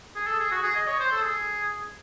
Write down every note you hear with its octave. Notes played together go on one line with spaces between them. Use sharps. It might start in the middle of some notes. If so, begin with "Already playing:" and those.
G#4
A4
G#4
F#4
G#4
D#5
C#5
C5
A4
G#4